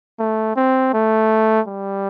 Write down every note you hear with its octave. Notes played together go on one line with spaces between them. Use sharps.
A3
C4
A3
G3